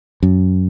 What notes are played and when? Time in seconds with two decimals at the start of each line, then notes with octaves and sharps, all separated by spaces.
0.23 F#2